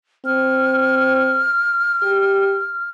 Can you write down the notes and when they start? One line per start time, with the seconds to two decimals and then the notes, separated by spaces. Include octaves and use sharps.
0.26 C4 F6
2.02 G4